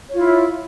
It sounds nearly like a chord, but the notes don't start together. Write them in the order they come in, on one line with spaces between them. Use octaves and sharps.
C#5 F4 E4